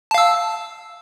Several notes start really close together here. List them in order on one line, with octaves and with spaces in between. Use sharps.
A5 F5 E6